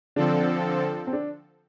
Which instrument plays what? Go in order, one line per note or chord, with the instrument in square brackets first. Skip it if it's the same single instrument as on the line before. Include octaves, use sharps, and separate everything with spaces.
[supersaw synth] D3 F3 C4 A4 [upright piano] D4
[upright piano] C4
D4